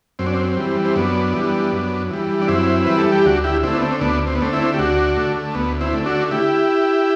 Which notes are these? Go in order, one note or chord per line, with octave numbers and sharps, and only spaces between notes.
F#2 C4
D4
C4
E3 G3
C4
F#2 B3 D4
E3 G3
F#2
E3 G3
D4
F#2 C4 E4
E3 G3 B4
A4
G4
D2 D4 F#4
E4 G4
D3 A3 C4 E4
B3
C4
D2 B3 D4
C4
B3
D3 A3 C4
C4 E4
G4
D2 D4 F#4
D3 A3
D2 B3
C4 E4
D3 A3
D4 F#4
E4 G4